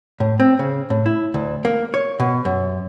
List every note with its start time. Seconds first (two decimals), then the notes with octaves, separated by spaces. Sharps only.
0.20 A2
0.40 C4
0.59 C#3
0.90 A2
1.06 E4
1.34 D2
1.65 A#3
1.94 C#5
2.20 B2
2.45 F#2